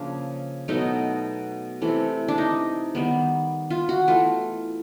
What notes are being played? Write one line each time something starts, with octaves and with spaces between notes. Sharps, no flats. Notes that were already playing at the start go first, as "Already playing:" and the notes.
Already playing: C#3 F3 A#3 D4
B2 F#3 A3 D#4
C3 E3 A3
D4
D#4
D#3 G3 B3
F4
F#4
E3 A3 F4